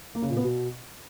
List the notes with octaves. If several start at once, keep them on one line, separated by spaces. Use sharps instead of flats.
A#3
C#3
A#2
B3
B2